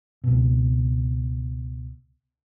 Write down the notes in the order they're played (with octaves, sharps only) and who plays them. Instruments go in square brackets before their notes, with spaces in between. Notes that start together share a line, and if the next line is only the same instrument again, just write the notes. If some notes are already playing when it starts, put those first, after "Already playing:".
[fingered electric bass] C#2 B2